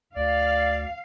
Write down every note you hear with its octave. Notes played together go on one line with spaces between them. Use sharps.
D2 D5 F5